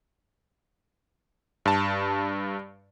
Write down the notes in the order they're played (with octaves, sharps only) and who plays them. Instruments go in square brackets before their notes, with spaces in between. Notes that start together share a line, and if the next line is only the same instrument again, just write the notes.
[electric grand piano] G2 A5